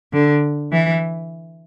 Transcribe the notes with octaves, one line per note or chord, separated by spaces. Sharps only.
D3
E3